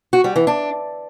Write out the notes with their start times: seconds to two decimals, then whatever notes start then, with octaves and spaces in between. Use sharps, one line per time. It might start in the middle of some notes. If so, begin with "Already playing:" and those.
0.13 F#4
0.24 G3
0.36 E3
0.47 D4